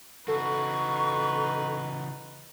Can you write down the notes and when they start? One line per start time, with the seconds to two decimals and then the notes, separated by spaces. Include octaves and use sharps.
0.28 C#3 E3 D#4 F#4 A4 B4 C#6